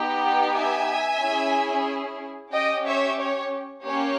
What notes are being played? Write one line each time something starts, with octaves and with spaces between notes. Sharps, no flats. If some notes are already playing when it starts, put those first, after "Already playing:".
Already playing: B3 D#4 G4
E5 G#5
C#4 E4 G#4
C#4 G4 D#5 G5
C#5 E5
C#5
A#3 C#4 G4 C#5